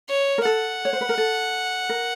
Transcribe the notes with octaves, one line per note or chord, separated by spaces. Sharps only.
C#5
A#4
A4 F#5
C#5
C5
B4
A#4
A4
A#4